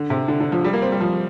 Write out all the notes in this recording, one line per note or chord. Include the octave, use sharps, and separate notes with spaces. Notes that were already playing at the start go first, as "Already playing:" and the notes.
Already playing: D3
C3
D3
D3
F3
G3
A#3
C4
G3
F3